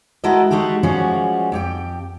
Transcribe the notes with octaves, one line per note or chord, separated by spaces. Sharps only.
G#3 E4 F#4 A4 A#4 D#5
G#3 D#4 F#4 G4 A4
F3 G3 G#3 C#4 F4 F#4
F2 G4 G5